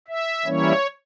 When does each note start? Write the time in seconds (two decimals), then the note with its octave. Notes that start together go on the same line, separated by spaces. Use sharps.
0.08 E5
0.46 E3 G3 A#3 C#4 E4 C#5